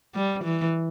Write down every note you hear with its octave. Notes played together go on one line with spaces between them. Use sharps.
G3
E3